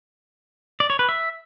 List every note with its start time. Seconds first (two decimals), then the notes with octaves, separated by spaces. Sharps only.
0.80 D5
0.90 C#5
0.99 B4
1.09 E5